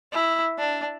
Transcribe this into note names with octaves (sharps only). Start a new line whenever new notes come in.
E4
D4